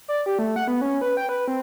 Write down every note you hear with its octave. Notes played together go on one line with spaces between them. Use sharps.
D5
G4
A3
F#5
B3
C#4
B4
G5
B4
C4